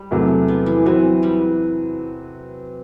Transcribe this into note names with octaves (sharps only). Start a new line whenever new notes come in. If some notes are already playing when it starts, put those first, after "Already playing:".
Already playing: G3
E2 C3 F#3 A3
B3
E3
E3 F#3 C4 F#4 B4
G3